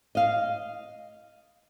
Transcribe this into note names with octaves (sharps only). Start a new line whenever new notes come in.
D#5 F5